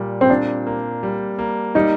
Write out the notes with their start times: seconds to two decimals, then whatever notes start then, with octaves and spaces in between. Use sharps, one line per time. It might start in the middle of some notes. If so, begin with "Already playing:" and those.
Already playing: A#2 G3
0.21 C4
0.30 A#2 D4
0.66 A#3
1.03 G3
1.39 A#3
1.75 G3 D#4